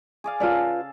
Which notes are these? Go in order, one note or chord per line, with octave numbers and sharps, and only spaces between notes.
G#4 D5 F5
C#3 F4 A4 B4 D5